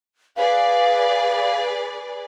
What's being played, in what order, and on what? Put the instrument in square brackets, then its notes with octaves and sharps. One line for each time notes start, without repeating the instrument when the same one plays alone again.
[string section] G#4 B4 D5 [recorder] F5